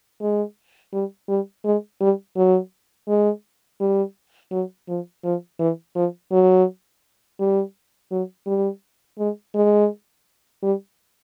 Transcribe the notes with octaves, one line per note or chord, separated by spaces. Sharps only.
G#3
G3
G3
G#3
G3
F#3
G#3
G3
F#3
F3
F3
E3
F3
F#3
G3
F#3
G3
G#3
G#3
G3